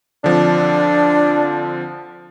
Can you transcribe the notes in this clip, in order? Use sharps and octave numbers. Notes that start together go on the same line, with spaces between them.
D3 F3 C4 D4